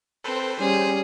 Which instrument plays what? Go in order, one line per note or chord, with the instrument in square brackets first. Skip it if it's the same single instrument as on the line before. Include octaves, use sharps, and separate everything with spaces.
[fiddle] C4 [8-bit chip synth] A4 B4 C5
[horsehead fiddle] G3 C#4 [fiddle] G#4 [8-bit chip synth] C5